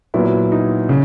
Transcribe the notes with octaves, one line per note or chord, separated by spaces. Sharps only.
A#2 F#3 B3 E4
D#4
C#3